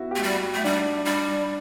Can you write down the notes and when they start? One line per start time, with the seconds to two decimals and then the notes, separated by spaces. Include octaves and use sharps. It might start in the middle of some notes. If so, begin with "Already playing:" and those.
Already playing: B3 E4 F#4
0.11 A3 G4
0.23 G3 F#4
0.54 A3
0.64 G3 D4
1.06 G3 D4